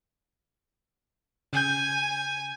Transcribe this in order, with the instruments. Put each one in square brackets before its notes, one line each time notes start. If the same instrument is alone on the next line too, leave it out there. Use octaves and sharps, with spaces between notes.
[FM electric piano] C#3 G6 [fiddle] G#5